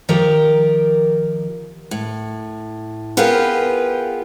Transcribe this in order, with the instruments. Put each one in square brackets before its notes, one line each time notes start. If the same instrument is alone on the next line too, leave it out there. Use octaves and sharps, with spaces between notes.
[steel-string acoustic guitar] D#3 F3 G4 A#4
A2
B3 F4 G4 G#4 A#4 B4